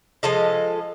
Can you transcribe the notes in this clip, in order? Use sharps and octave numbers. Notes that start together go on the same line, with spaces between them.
F3 G#3 A4 D#5